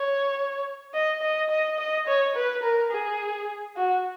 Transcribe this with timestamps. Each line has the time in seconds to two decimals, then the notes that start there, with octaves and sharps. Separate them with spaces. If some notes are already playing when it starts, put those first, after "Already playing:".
Already playing: C#5
0.94 D#5
1.22 D#5
1.50 D#5
1.78 D#5
2.07 C#5
2.35 B4
2.63 A#4
2.91 G#4
3.77 F#4